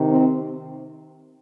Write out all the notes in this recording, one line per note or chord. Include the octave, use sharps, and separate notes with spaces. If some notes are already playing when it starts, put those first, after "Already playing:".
Already playing: C3 D#3
C4